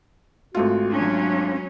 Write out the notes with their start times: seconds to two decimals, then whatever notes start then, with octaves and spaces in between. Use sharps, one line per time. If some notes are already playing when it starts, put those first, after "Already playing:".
0.55 G#1 A3 F4 F#4
0.92 F#3 C#4 D4